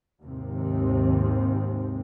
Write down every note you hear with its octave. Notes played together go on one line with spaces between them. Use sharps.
D#2 G#2 C3 C4